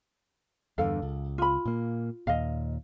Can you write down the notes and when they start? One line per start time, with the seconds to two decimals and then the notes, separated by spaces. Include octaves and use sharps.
0.78 E2 G2 D3 A4 F5
1.02 C#2
1.38 F4 B5
1.65 A#2 A#3
2.27 D#2 A#2 D#5 F5